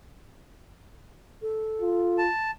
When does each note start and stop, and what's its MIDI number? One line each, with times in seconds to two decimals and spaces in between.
1.42 2.21 69
1.80 2.28 65
2.18 2.51 81